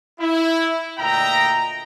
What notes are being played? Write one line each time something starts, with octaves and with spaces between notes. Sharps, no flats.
E4
D2 A#2 D#5 E5 G5 A#5